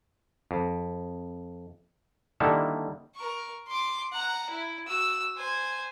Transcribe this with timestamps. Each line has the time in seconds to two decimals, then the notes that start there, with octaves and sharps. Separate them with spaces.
0.51 F2
2.40 D3 D#3 G3 A#3 E4 A4
3.15 A#4 C#6
3.68 C6 D6
4.12 F#5 A#5
4.50 E4
4.88 F#4 E6
5.37 C5 G#5